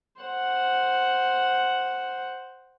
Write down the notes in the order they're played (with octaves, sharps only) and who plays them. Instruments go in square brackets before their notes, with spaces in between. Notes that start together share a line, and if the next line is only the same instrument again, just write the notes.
[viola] C5 F#5